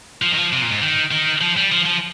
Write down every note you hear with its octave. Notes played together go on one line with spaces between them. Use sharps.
F3
D#3
F3
C3
A#2
G#2
D#3
D#3
F3
G3
F3
F3